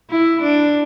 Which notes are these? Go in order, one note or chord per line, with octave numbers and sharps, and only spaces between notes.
E4
D4